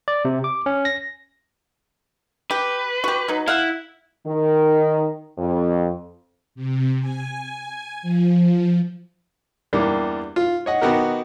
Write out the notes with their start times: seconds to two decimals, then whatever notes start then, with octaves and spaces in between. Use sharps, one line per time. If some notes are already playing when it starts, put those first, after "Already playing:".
0.08 D5
0.25 C3
0.44 D6
0.66 C#4
0.85 A#6
2.51 G4 B4
3.04 F#4 G4
3.28 F#3 D#4
3.48 E4 F5 F#5
4.26 D#3
5.38 F2
6.55 C3
7.01 G#5
8.02 F3
9.73 E2 G2 G3 A#3 G4
10.36 F4
10.66 C#5 D#5 F#5
10.81 D#3 B3 D#4 F#4 G4 A#4